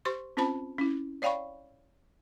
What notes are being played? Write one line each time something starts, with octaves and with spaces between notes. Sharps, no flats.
G4 C5 C6 C#6
C4 C#4 F4 C5 A5 B5
C#4 E4
C#5 D5 F5 G5 B5 C#6